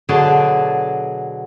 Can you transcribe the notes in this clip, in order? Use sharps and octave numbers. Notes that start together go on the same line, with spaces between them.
B2 D3 F#3 G#4 D5 A5